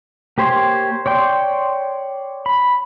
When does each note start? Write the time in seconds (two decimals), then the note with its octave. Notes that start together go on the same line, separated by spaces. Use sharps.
0.38 A#3 G4 C5 C#5 C6
1.06 C#5 D5 G5 C6
2.46 B5